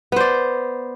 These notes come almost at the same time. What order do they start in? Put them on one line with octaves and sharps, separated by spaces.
B3 C5 D5